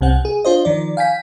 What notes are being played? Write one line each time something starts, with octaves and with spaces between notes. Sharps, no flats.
C2 C3 C4 F#5
G#4
D4 F4 C5 D#5
D#3 F3 D5
F5 G5 G#5 B6